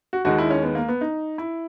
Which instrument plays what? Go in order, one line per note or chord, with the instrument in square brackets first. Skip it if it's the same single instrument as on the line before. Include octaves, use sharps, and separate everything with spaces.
[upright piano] F#4
D#2 D#3 G#3 F#4
E4
C#4
B3
A#3
B3
D#4
E4